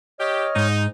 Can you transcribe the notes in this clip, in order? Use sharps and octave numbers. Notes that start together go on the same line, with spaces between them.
G4 C#5 D#5 F6
G#2 D#4